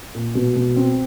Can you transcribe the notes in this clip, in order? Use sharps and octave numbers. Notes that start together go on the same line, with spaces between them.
A#2
B2
B2
C4